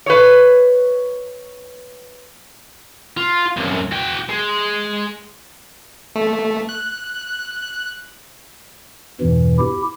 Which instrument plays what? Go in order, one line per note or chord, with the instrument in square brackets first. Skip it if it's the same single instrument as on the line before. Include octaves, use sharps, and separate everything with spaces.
[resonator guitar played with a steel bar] B4 C#5
[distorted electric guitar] F4
C2 F#2
F#4 G5
G#3
[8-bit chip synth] A3
F#6
[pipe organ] E2 G2 B2 E3
E4 G4